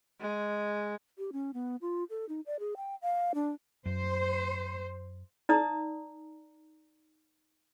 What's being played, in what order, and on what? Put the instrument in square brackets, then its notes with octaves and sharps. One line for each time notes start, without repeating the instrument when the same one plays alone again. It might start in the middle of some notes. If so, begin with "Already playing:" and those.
[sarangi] G#3
[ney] G4
C#4
B3
F4
A4
D#4
D5
G#4
G5
F5
D4
[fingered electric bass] F#2 [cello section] C5
[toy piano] D#4 D5 A#5 D#6